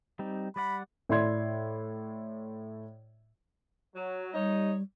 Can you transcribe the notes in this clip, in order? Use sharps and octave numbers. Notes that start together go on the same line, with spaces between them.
G3 C4 D#4
G3 D5 F#5 B5
A2 E4 D5 C6 G#6
F#3
G3 D#4 C#5 D#5